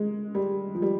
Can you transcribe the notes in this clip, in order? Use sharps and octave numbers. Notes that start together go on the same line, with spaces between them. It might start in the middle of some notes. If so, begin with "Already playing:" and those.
Already playing: G#3
G3
F3
G3